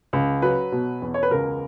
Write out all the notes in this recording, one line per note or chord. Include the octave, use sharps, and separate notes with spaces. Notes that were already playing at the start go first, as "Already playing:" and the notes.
C#2
F#3 B4
B2
E2
C#5
B4
C#2 A#4